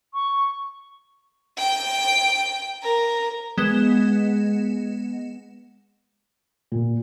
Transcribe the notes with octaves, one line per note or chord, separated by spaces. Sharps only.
C#6
G5
A#4
G#3 B3 E7
A#2